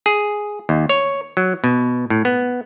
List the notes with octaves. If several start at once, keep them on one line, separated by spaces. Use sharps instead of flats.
G#4
D#2
C#5
F#3
B2
A2
B3